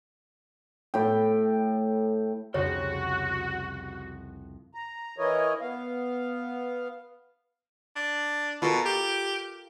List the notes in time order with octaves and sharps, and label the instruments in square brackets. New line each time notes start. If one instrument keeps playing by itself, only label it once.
[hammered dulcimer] A2 G5
[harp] C2 F2 C#3 [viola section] F#4 [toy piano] C#5
[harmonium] A#5
E3 E4 A#4 C#5 D#5
B3 F5
[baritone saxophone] D4
[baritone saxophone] B2 [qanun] F4 A4 A#4
[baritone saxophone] G4